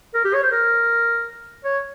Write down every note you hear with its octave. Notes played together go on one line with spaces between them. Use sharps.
A#4
G4
C#5
C5
A#4
C#5